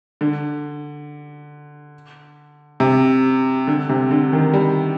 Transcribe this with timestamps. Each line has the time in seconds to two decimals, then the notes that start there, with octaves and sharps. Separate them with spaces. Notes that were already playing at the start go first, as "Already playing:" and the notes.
0.21 D3
2.80 C3
3.67 D3
3.89 C3
4.11 D3
4.32 D#3
4.53 G3